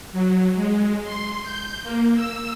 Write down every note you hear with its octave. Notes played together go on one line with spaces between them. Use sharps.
F#3
G#3
C6
G6
A#3
E6